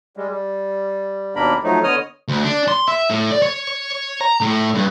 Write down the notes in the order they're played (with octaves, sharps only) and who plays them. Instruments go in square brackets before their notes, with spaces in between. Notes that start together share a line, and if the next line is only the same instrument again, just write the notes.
[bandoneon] G3 G#3
G3
D#2 B2 A#3 D4 A#4 B5
F3 F#3 A3 D#4
D3 B3 C#5 D#5 D#6 F6
[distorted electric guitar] D2
D4
C6
E5
A2
D5
C#5
A#5
A2
G2